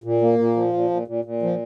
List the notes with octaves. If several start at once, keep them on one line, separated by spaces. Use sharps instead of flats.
A#2
A#3
A#2
F3
A#2
A#2
A#2
A#2
F3